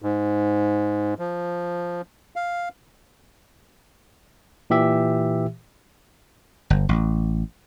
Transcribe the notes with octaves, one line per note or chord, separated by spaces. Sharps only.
G#2
F3
F5
A#2 E3 G4 E5
G1
A1